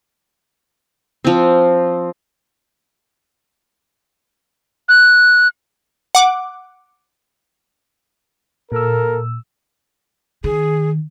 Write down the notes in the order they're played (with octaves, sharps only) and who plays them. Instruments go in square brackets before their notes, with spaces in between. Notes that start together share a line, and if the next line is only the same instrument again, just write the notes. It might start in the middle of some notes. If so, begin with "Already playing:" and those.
[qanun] F3 C4
[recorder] F#6
[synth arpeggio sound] F#5 D6
[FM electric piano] A#2 E6 [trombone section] A#3 A4 A#4
[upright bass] D#3 [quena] G#4